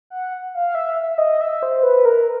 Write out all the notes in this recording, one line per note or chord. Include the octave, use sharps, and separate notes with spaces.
F#5
F5
E5
E5
E5
D#5
E5
C5
B4
A#4